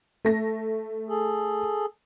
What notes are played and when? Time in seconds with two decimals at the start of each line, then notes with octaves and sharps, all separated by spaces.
0.25 A3 A#6
1.09 G#4 A4